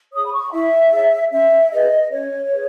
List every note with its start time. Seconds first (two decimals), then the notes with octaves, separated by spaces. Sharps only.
0.13 G#4 C#5 D#6
0.26 B5
0.32 C#6
0.52 E4 E5
0.93 G#4 C#5
1.32 C#4 E5
1.71 G#4 B4 D#5
2.11 C#4 C#5
2.52 G#4 B4